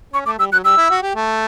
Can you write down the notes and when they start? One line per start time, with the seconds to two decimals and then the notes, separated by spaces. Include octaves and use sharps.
0.13 C#4 C#6
0.26 A3 D6
0.39 G3 E6
0.52 F#3 F#6
0.64 G3 E6
0.77 E4
0.91 F#4
1.02 G4
1.16 A3